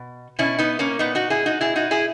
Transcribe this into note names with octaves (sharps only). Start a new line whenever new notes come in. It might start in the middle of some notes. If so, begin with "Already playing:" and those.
Already playing: B2
B2 C#4 E4
B3 D#4
A#3 C#4
A#2 B3 D#4
D#4 F#4
E4 G#4
D#4 F#4
B2 E4 G#4
D#4 F#4
E4 G#4